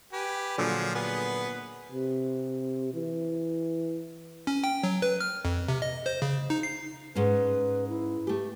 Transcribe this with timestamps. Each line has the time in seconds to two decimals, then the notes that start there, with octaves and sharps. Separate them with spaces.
0.13 G4 B4 G#5
0.58 A#2 D3 F3 F#3 G#4
0.95 B3 G#4 B4
1.92 C3
2.94 E3
4.47 C#4
4.64 G5
4.84 F#3
5.02 B4
5.20 F6
5.45 F2
5.69 C3
5.82 D#5
6.06 C5
6.22 C#3
6.50 D#4
6.63 C7
7.15 G#2 C#4 B4
7.89 E4
8.27 A3 G4